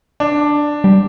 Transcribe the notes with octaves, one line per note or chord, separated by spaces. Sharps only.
D4
G3